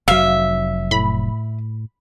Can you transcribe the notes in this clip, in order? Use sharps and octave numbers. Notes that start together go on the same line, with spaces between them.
F1 F#3 E5 F5
A2 B5